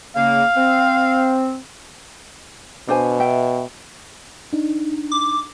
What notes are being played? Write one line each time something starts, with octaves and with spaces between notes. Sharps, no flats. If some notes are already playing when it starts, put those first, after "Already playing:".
C#3 A#3 F5
C4
B2 D4 C5 G#5
E5 G5
D4 D#4
D6